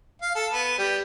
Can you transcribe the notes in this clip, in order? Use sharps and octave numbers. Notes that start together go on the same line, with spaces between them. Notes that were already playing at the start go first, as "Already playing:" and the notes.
F5
A4
B3
G3